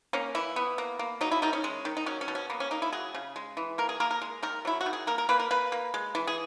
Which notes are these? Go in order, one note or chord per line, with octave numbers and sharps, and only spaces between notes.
A#3 C#4
E3 E4
B3
A#3
A#3
F#3 D#4
E4
D#3 D#4
C#4
G#3
D#3
D#4
F#3 C#4
C#4
B2
C#4
A#3 B3
C#4
A#3 D#4
E4
F#3 G#4
C#3
G#3
E3
A#3 A#4
G#4
A#3 A#4
A#4
G#3
D#3 A#4
F#3 E4
F#4
D#3
G#4
A#3 A#4
A#4
A#3 B4
A#4
A#3 B4
A#3
G#3
E3
G#4